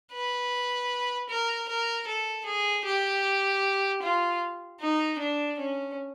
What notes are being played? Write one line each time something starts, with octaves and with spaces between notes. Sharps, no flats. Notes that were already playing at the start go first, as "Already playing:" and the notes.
B4
A#4
A#4
A4
G#4
G4
F4
D#4
D4
C#4